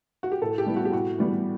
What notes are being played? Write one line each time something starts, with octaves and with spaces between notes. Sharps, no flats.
F#4
G4
A2 A4
G4
G3 B3 E4
F#4
G4
A2 F#4
E3 G3 B3